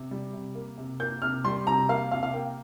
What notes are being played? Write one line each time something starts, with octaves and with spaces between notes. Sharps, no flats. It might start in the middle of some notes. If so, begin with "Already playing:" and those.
Already playing: C3
G3
C3
A#3
C3
A#3 G6
C3 F6
G3 C6
C3 A#5
A#3 F5
C3 F5
F5
A#3 G5